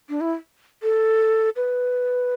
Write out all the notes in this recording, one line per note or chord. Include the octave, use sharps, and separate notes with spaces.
D4
E4
A4
B4